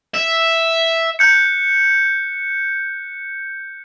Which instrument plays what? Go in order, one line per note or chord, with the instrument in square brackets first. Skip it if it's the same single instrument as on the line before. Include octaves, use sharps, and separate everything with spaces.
[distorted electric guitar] E5
[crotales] F#6 G6 C#7